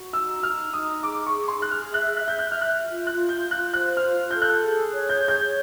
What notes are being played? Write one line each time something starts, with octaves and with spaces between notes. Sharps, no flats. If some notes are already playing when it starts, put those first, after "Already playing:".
Already playing: F#4
D#4 E6
D#4 F6
D#4 D#6
G#4 D6
C#6
G#4
C6
G#4 F#6
F6
E5 F#6
F#6
E5 G6
F#6
E5 F6
F#6
F4
F#6
F4
G6
F4
F#6
C5 F#6
F6
F4
A4 G6
F#6
G#4
C#5
G6
G#4 G6